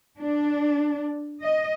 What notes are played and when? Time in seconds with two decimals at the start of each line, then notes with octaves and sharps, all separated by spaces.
0.20 D4
1.42 D#5